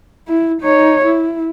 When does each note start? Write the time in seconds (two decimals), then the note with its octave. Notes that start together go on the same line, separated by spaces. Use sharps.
0.28 E4
0.61 D#4 C#5
1.05 E4